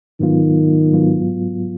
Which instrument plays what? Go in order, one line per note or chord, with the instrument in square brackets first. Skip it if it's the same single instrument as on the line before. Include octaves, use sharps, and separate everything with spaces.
[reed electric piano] G#2 F#3 B3 F4 [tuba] D#3
[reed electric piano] G#2 F#3 B3 F4